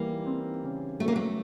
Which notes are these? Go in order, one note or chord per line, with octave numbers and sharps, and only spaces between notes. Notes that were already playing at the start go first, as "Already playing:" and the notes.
Already playing: E3 G3 A#3
C4
C#3
F#3 A3
A#3
A3